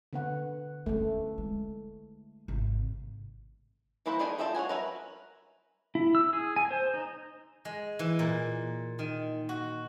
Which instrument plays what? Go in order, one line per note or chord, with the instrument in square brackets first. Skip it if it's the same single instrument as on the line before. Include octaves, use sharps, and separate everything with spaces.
[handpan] D3 B3 F#5
[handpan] A3 [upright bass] B3 C#4
[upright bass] G#3
G#1 C3
[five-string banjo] E3 A#3 E4 B4 C5
D#3 D4 G#4 D#5 G#5
F4 A4 D#5 E5 G5
C#5 D5 F#5 G#5
A#4 B4 E5
[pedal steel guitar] E4
E6
G#4
G#5
C5
D#4
[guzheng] G#3
E3
A#2
D#3
F#4